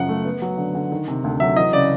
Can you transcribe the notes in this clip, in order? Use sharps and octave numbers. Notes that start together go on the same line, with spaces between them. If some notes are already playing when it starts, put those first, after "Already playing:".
Already playing: F#2 C#3 F3 F#5
A3
B3
F#3
D3
D3
D#3
C3
D2
F#3 E5
E3 D#5
C#3 D5